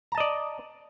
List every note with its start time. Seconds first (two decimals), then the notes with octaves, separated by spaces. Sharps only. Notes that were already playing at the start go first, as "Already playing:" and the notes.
0.12 A#5
0.15 A5
0.18 D#5
0.20 D5